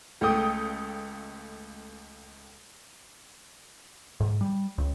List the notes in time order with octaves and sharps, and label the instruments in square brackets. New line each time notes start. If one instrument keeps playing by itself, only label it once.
[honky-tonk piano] C#2 A3 A4 G5 D#6
[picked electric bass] G#2
G3
C#2